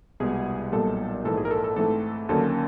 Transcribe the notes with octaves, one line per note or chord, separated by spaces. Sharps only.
C2 B2 G#3 B3 G#4
B1 A#2 G3 B3 A4
A#1 G#2 E3 A4
G#4
A#4
A4
A4
G#2 E3 A3 C4 A4
D#2 D3 F#3 A#3 C#4 A4